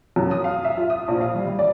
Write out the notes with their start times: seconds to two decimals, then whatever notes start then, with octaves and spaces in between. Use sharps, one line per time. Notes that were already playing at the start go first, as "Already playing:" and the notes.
0.16 F#2
0.31 D#6
0.44 F5
0.65 E5
0.77 F4
0.90 D#6
1.08 A#1
1.21 F5
1.35 G3
1.46 G3
1.59 D5